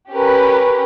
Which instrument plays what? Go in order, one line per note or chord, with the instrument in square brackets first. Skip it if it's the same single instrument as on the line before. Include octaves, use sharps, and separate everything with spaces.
[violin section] C#4 G4 A#4 B4